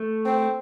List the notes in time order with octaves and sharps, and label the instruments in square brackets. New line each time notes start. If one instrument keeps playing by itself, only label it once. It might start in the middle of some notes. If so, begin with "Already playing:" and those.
Already playing: [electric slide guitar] A3
[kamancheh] C4